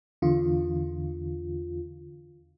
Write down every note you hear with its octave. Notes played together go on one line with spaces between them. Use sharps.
E2 D3 F4